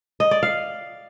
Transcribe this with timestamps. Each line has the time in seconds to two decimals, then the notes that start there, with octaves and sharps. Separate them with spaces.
0.20 D#5
0.31 D5
0.43 F5